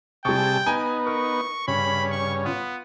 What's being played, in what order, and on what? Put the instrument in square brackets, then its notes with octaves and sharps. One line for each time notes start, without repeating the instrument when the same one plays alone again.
[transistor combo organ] C3 G#4 A5 [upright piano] G3 C#6 [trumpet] G5
[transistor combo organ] B3 D#4 [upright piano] G#5 A#5
[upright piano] A#4 [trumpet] C#6
[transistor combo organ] G2 C#3 C#4 [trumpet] B5
[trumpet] C#6
[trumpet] B3 [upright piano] F4